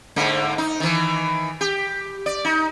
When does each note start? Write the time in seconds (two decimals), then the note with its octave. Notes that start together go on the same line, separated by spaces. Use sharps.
0.16 G#2 D3 A#3
0.58 D#4
0.80 D#3 E3
1.61 G4
2.26 D5
2.45 D#4